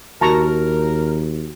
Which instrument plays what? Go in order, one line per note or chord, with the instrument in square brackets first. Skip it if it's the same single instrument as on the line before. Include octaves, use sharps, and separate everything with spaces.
[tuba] D#2 [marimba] F#4 [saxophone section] A#4 [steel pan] A5 A#5 C#6